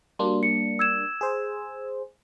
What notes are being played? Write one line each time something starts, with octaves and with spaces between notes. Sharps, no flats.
G3 A#3 D4 F#4 D5 C6
C#7
E6 G#6 E7
G#4 C5